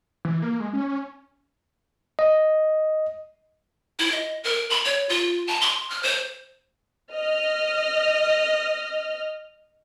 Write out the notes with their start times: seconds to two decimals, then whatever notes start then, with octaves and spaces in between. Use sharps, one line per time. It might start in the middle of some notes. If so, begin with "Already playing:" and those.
0.25 E3
0.42 A#3
0.60 G#3
0.73 C#4
2.19 D#5
3.99 E4
4.12 D#5
4.44 A#4
4.70 B5
4.85 C#5
5.09 F4
5.47 A5
5.61 C6
5.90 F6
6.03 C5
7.13 D#5 F6